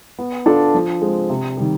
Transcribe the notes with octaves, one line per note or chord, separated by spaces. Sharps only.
B3
D4 F4 A4
F3
G#3 C4
C3
D#3 G3